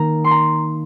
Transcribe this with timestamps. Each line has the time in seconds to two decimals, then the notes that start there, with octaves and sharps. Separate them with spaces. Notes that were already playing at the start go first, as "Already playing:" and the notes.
Already playing: D#3 A#3 D#4 A#5
0.24 C6
0.31 A#5